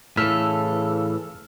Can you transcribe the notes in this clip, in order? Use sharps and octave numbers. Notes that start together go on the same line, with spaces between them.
A2 C#3 E3 A4 E6 F6 B6